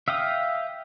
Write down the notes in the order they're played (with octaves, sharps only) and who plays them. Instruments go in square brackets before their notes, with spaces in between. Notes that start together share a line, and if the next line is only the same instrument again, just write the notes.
[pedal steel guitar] E5 F5 G5 D#6